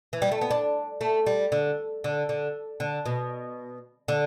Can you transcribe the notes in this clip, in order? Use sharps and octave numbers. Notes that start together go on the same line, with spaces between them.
E3
G3
A3
B3
D4
A3
G3
D3
D3
D3
D3
B2
D3